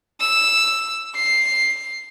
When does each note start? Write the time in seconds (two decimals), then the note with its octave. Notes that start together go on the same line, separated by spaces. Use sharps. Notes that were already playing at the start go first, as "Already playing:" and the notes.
0.21 E6
1.15 C7